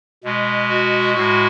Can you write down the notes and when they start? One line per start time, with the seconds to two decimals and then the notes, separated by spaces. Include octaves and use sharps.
0.24 B2 G#3
0.69 F#4
1.14 A2 G#3 F#4